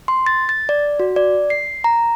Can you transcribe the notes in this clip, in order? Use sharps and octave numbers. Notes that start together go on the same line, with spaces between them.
C6
A6
A6
D5
F#4
D5
C7
A#5